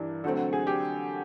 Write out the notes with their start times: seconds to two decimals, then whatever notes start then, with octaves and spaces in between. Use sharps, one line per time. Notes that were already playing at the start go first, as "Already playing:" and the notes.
Already playing: G2 E3 G3 D4 A#4
0.24 D3 F#3 A3 C4 A4
0.53 G#4
0.67 G4